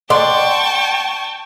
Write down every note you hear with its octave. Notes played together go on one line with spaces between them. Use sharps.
D5 F#5 G5 A5 C6 C#6